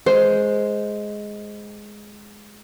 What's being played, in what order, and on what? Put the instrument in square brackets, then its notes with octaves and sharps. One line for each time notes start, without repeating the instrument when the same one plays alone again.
[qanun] G#3 [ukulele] C5